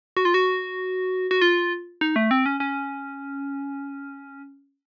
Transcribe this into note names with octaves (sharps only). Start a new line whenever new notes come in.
F#4
F4
F#4
F#4
F4
D#4
A3
C4
C#4
C#4